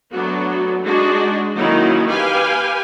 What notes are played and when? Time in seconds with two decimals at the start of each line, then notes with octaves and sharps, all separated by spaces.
0.12 F#3 A3 B3 D4 F#4
0.84 G#3 D4 D#4 F#4 G#4
1.57 D#3 F#3 A#3 C#4 D#4 E4
2.07 G4 B4 F5 G5 G#5